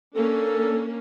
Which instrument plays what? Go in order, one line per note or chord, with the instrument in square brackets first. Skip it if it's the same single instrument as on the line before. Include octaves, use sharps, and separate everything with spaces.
[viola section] A#3 C#4 D4 [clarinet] A4